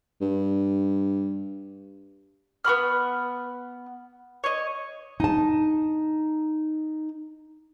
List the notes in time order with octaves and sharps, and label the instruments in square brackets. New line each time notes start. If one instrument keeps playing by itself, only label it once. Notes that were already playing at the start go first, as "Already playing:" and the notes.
[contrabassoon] G2
[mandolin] B3 F#4 B5 F6
C#5 D#5
[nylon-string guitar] D#4 A5